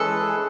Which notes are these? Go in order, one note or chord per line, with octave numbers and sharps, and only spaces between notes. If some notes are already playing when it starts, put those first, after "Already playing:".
Already playing: E3 G#3 C#4 G#4 A4 B4